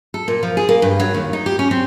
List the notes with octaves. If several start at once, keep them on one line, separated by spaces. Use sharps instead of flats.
A4
A#2
F3
G#4
A#3
G2
F#3
D#2
D#4
G4
C#4
C4